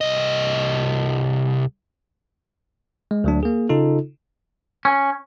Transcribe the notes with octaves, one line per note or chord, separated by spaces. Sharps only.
C2 D#5
G#3
D2 F#3 D4
A#3 G#4
C#3 D#4 F4 A4
C#4